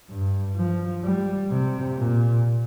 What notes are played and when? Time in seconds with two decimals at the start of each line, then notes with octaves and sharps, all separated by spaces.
0.10 G2
0.57 F3
1.04 G3
1.50 C3
1.97 A#2